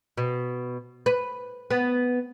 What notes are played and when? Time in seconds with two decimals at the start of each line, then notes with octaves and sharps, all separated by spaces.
0.17 B2
1.06 B4
1.71 B3